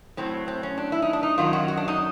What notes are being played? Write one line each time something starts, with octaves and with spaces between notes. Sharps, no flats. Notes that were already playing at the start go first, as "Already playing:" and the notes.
A2 F#3 C4
C4
C#4
D4
E4
D#4
D4
D#4
F#2 D#3 F#3 F4
F#4
F#4
D4
D#4